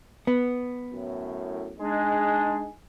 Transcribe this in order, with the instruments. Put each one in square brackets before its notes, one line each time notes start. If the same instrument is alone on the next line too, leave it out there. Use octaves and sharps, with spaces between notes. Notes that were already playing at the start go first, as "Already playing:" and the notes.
[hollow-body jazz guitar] B3
[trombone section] F#2 A2
[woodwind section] G#3 D4 [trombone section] D#4 G#4